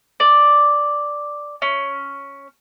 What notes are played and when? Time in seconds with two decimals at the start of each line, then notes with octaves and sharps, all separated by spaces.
0.20 D5
1.62 C#4